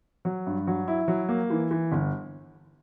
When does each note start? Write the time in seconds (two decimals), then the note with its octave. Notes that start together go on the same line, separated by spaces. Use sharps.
0.25 F#3
0.46 G2
0.67 F#3
0.88 E4
1.08 F#3
1.29 A#3
1.50 E3
1.71 E3
1.92 G1